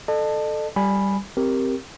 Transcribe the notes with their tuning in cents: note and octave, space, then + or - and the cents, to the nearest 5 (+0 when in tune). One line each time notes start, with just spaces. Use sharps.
A4 +0 D#5 -45 A5 +5
G3 +0 G#5 +0 B5 +0
C4 +0 G4 +0 A#4 +0